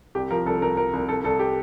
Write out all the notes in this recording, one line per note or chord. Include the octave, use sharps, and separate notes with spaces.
C2 G4
F3 A#4
C2 A4
C2 A#4
F3 A#4
C2
C2 A4
C2 A4
G4